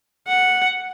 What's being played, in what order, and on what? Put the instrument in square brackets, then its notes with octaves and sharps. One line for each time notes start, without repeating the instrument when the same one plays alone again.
[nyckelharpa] F#5